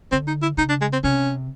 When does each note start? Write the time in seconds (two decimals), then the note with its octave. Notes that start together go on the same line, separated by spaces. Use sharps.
0.12 D3 C4
0.27 D#4
0.42 E4
0.57 C#3 D#4
0.69 D4
0.81 G#3
0.92 C4
1.04 C3 C#4